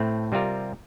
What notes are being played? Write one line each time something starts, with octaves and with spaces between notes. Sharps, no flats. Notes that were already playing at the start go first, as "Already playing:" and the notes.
Already playing: A2 A3 C4
C3 G3 C4 F4 A#4